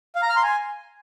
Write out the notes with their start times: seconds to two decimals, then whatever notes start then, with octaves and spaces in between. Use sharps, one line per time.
0.15 F5
0.22 A#5
0.29 F6
0.36 C6
0.43 G#5